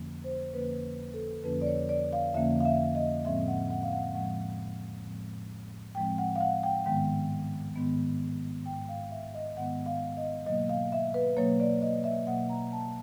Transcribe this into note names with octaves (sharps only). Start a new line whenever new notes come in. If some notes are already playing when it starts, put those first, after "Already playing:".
Already playing: F2 D3 F3 A#3 C#4
C5
F2 D3 F3 A#3 C#4 B4
A4
F2 D3 F3 A#3 C#4 B4
D5
C#5
D5
F5
F2 D3 F3 A#3 C#4 E5
F5
E5
D#5
A2 F3 G#3 C4 E5
F#5
F#5
F5
F#5
A2 F3 G#3 C4 F#5
A2 F3 G#3 C4
A2 F3 G#3 C4 G5
F#5
F5
F#5
G5
G#2 D#3 G#3 B3 G5
G#2 D#3 G#3 B3
G#2 D#3 G#3 B3 G5
F5
E5
D#5
G#2 D#3 G#3 B3 F#5
F5
D#5
B2 F#3 A#3 D#5
F5
E5
B4
B2 F#3 A#3 C#5
D5
D#5
E5
B2 F#3 A#3 F#5
A#5
A5